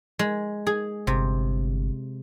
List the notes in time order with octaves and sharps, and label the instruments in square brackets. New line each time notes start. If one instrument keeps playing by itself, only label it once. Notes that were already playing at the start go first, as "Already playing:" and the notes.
[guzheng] G#3
G#4
[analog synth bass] G1 [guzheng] C3